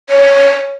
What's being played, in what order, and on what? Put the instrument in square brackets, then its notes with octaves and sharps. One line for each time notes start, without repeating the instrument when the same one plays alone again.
[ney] C#5